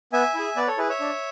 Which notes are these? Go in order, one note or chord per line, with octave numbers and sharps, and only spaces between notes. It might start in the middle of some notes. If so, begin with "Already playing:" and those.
B3 E5 G#5
E4 G#4
B3 B4 D5
A4 C#5
E4 G#4 B4
C#5 E5
D4